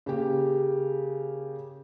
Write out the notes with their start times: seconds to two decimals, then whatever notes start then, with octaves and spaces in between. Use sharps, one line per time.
0.06 C#3 A#3 G4